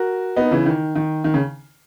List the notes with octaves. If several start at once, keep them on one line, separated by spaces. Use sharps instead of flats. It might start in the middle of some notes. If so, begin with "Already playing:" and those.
Already playing: F#4 A#4
B3 D#4
C#3 E3
D#3
D#3
D#3
C#3